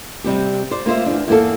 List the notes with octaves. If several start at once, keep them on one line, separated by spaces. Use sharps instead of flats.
C3 G3 C4 G4
C5 D5
A#3 F4 C5 E5
E2 G#2 D4
E2 A#3 A4